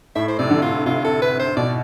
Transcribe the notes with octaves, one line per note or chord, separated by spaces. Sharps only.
A2 E5
C5
C3 D5
D3
F4
C3 F4
A4
B4
C5
B2 D5